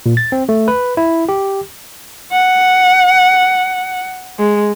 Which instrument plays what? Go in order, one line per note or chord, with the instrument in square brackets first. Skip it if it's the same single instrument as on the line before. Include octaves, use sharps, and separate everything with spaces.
[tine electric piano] A#2
A6
C4
A3
B4
E4
G4
[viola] F#5
G#3